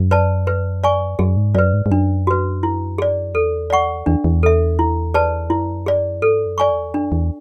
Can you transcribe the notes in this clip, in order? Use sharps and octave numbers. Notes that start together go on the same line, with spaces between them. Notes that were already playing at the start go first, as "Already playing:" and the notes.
Already playing: F#2
B4 D5 A5
B4
D5 G#5 C#6
F#2 G#4
G#2
F#2 B4 D5
G#2
G#2
F#2 D4
F#4 B4
E4
G#4 D5
E2 A4
D5 F#5 C#6
E2 D4
E2
A4 E5
E4
G#4 B4 D5 A5
F#2 E4
G#4 D5
G#2 A4
F#2
D5 G#5 C#6
E2
F#2 D4
E2